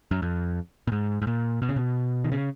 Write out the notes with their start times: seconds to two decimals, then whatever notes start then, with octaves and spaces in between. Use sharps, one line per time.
0.11 F#2
0.22 F2
0.87 A#2
0.92 G#2
1.22 G#2
1.27 A#2
1.62 B2
1.69 C#3
1.76 B2
2.24 D#3
2.32 C#3